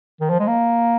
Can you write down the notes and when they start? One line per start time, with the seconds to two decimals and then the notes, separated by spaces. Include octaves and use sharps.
0.20 D#3
0.30 F3
0.39 G#3
0.47 A#3